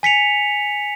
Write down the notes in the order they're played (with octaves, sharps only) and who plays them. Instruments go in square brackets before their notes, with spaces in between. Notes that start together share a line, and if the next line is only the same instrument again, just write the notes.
[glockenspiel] G#5 B6 C#7 F7